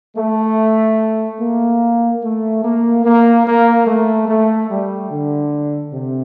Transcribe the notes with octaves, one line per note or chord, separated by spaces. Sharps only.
A3
A#3
A3
A#3
A#3
A#3
A3
A3
G3
D3
C3